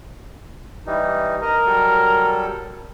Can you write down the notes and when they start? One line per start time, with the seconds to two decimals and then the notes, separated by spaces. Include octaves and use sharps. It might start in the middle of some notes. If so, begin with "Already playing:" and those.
0.87 E3 G3 D#4
1.42 A#4 D#5
1.66 F#3 G3 A4